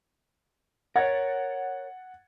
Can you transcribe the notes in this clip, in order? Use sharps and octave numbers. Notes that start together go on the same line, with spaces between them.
A#4 C#5 F#5 G#6 A6